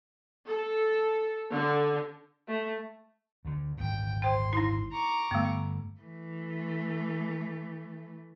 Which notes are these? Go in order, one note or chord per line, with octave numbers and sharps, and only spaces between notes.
A4
D3
A3
D2 D3
G#1 D2 A#2 G5
C5 G5 C6
D#4 E4
A#5 C#6 D6
G2 D3 A3 B3
E3 A3